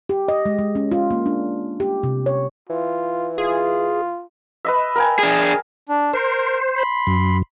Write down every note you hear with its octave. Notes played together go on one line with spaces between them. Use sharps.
G4
D#5
G#3
G#3
C#4
F4
A#3
D4
G4
C3
C#5
E3 F4
F4 G#4
B4 D#5 E5
A#4 G5 G#5
D4 G#4
D4
A#4 C5
B5 C6
F#2